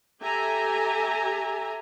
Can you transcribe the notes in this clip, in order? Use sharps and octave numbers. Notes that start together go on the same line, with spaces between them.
G4 A4 E5 G#5 A#5